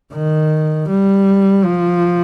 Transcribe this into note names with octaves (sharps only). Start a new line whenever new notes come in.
D#3
G3
F3